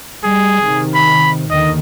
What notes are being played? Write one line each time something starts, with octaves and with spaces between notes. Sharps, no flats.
G3 G#4
C3 D#3
B5
D#2 D3 D#3 D#5